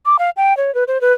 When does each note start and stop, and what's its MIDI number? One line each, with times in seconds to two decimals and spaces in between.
0.06 0.17 86
0.19 0.30 77
0.37 0.56 79
0.57 0.74 73
0.75 0.84 71
0.88 1.01 72
1.01 1.13 71